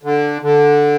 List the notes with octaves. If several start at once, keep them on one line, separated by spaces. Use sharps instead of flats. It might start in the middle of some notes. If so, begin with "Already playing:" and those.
D3
D3